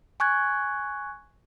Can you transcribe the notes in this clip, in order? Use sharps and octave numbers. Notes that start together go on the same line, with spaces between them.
G#5 C#6 F#6 G#6